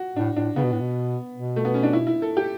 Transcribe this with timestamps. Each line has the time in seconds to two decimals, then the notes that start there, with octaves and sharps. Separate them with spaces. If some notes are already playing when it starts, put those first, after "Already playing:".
Already playing: F#4
0.16 A2 D4
0.36 A2 D4
0.56 C#3 B3
0.64 B2
0.72 A2
0.80 B2
1.34 B2
1.56 A3
1.65 B3
1.74 C#4
1.83 D4
1.93 E4
2.07 E4
2.22 A4
2.37 G4